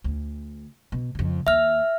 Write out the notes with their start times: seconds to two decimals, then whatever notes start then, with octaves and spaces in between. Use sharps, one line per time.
0.04 D2
0.92 B2
1.15 F2 C#3
1.47 D#2 E5 F6